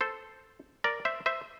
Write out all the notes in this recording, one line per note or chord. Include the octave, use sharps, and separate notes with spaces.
A4 C5
A#4 D5
C5 E5
C5 E5